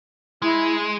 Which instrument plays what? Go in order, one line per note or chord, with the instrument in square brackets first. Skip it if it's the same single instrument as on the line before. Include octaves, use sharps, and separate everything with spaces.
[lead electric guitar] G#3 [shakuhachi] E4